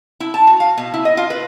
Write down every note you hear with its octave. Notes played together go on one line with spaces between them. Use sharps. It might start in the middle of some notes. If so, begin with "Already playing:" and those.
E4
A5
F#4
F5
B2
E4
D#5
F4
B4